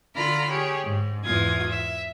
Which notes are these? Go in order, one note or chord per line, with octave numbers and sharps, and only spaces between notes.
D3 F4 D5 A#5 B5 F6
G4 G#4 C#5
G#2
E2 G#2 F4 D#6 G#6
E5